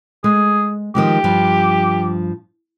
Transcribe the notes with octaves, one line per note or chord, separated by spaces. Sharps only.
G#3 G#4
D#3 F3 G#3 G4
G2 F3